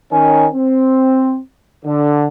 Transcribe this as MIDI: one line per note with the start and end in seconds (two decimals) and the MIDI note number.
0.12 0.47 51
0.12 0.47 61
0.12 0.47 80
0.53 1.38 60
1.85 2.28 50